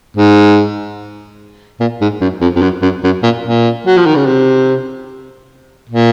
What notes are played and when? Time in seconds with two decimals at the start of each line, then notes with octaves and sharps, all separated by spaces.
0.17 G#2
1.80 A#2
2.01 G#2
2.21 F#2
2.41 F2
2.56 F2
2.62 F#2
2.82 F#2
3.04 F#2
3.23 A#2
3.44 A#2
3.87 F#3
3.97 F3
4.06 D#3
4.16 C#3
4.26 C3
5.90 A#2